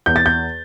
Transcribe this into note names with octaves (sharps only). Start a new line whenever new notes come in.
E2 G6
A6
G6